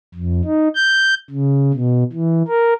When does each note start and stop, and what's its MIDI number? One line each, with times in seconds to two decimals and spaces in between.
0.14 0.41 41
0.45 0.68 63
0.75 1.14 91
1.30 1.72 49
1.74 2.04 47
2.12 2.42 52
2.48 2.74 70